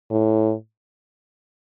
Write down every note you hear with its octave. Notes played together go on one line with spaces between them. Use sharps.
A2